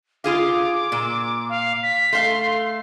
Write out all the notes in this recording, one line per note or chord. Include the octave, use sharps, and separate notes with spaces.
F4 G#4 F5 D6
A#2
F5
B6
A3 F5 C6